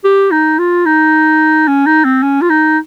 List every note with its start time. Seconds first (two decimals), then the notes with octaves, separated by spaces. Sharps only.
0.04 G4
0.31 D#4
0.59 F4
0.86 D#4
1.68 C#4
1.86 D#4
2.04 C4
2.22 C#4
2.41 F4
2.50 D#4